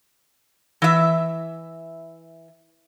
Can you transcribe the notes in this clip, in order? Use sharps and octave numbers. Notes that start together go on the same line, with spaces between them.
E3 E5